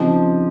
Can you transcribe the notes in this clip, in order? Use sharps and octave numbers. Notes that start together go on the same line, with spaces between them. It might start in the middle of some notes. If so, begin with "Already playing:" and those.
Already playing: C#3 F3 C4 D#4 G4